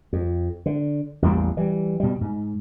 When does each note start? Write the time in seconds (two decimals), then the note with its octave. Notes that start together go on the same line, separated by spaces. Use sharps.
0.13 F2
0.66 D3
1.22 A1 E2 G3 A#3
1.57 E3 G3
2.00 B2 G3
2.21 G#2